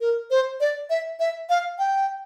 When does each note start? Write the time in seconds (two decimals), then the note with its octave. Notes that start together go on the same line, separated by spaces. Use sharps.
0.01 A#4
0.30 C5
0.60 D5
0.90 E5
1.19 E5
1.49 F5
1.79 G5